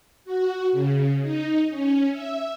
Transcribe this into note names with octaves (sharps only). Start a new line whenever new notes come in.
F#4
C#3
D#4
C#4
E5